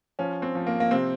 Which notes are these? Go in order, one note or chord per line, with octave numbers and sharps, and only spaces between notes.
F3 C#4
C4
F3
A#3
A#3
C3 C4